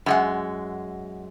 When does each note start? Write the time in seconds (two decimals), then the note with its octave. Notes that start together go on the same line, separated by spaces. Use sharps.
0.06 F#2 G#3 F#5